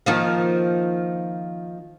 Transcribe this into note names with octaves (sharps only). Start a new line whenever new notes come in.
D#3 F3 A#3